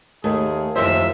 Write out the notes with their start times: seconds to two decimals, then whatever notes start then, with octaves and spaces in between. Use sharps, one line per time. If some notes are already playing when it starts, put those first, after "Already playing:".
0.24 D#2 A3 G#4
0.76 F#1 D#2 F3 F4 C5 E5